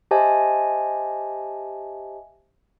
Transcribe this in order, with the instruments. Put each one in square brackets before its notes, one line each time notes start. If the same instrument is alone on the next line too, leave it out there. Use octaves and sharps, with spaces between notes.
[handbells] G4 C5 D#5 E5 G#5 A5